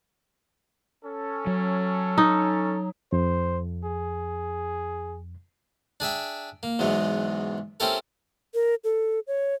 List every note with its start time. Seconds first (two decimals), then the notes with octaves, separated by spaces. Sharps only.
1.05 C#4 A4
1.47 F#3
2.18 D#4
3.12 F2 C5
3.84 G#4
6.00 D4 G#4 E5 G5
6.63 A#3
6.79 E2 G#2 B2 E3 F#3
7.80 C4 C#4 E4 G4 A4 A#4
8.54 A#4
8.84 A4
9.27 C#5